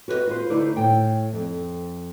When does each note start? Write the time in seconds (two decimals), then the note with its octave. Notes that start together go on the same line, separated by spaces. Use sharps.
0.08 F#4 B4 C5 D#5
0.27 F4 B4 C5
0.50 D2 D#4 E4 C5 D5
0.76 A2 G5
1.33 F2